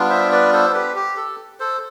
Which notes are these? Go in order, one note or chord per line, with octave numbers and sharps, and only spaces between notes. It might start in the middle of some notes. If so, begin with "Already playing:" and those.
Already playing: G3 B3 D4 F4
C5 E5
B4 D5
A4 C5
G4 B4
G4
A4
A4 C5